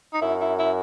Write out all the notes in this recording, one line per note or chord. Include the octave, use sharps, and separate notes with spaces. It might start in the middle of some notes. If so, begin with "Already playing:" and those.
D#4
F#2 E4
E4
E4